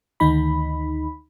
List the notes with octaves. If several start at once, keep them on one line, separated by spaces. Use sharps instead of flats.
D2 D#3 D#4 B5